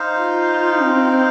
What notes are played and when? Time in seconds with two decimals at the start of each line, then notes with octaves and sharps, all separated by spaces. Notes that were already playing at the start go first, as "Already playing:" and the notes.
Already playing: D#4 C5 F5
0.19 F4
0.81 C4